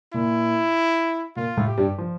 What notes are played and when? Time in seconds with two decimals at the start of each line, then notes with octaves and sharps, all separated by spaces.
0.14 A#2 A#3 E4
1.36 A#2 A#3 F4
1.57 A2 A3
1.67 G4
1.78 G2 G3
1.98 F3